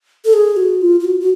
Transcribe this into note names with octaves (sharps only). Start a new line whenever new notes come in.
A4
G#4
F#4
F4
F4
F#4
F#4